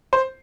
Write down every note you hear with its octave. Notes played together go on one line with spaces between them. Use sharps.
C5